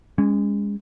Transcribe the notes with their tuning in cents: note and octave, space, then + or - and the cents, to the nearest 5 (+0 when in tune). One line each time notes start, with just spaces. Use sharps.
G#3 -25 C#4 +15